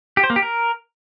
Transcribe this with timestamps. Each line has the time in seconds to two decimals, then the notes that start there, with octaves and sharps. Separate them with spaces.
0.17 G4
0.23 C5
0.30 A#3
0.36 G4
0.42 A#4